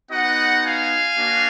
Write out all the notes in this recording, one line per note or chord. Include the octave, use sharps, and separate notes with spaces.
B3 D#4 F#4 D#5 F#5
F5 G#5
A#3 D4 F#4